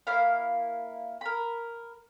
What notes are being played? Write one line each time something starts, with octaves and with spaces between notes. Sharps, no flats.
A#3 E4 F5
A#4 B5